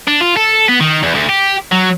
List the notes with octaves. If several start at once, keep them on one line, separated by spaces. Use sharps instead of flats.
D4
F4
A4
B3
D#3
E2
D2
G4
F#3